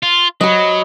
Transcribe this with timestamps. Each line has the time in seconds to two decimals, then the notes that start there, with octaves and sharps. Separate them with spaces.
0.03 F4
0.41 F#3 D#5 B5